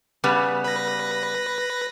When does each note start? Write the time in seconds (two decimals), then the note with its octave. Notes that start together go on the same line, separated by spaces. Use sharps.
0.24 C#3 G3 B3
0.64 B4 A#6